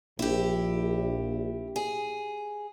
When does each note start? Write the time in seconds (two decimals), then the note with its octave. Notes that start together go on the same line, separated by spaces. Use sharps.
0.19 A#1 E4 G4
1.76 G#4